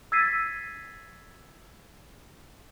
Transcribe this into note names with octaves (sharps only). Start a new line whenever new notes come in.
E6 G#6 A6 B6 C7 D#7